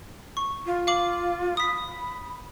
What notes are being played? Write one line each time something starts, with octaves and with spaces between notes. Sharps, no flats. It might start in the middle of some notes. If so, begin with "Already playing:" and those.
C#6
F4
F5 D6 F#7
B5 D#6 B6